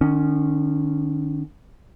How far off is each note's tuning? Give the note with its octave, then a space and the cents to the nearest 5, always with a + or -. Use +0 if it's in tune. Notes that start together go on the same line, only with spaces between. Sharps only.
D#3 -45 C#4 +0